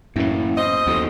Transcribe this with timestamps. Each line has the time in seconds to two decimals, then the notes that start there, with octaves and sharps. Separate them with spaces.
0.16 F#2 A2 E3 A#3 C#4 F5
0.58 B2 C5 D#5
0.87 F#1 D#2 B3 F#4 A4